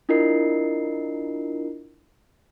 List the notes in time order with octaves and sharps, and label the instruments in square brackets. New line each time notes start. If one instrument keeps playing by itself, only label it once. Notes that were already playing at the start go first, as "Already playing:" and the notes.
[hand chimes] D4 E4 F4 A#4 D#5 C7